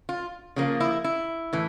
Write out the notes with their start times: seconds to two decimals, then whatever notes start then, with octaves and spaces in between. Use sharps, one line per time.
0.09 F4
0.56 C#3 F3 A#3
0.80 E4
1.04 E4
1.53 A2 E3